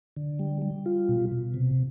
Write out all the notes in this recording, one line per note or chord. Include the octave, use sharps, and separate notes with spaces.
D3
G3
G3
F4
B2
B2
C3